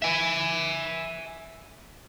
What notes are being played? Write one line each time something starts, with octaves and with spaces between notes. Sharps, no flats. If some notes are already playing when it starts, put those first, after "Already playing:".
E5 G#5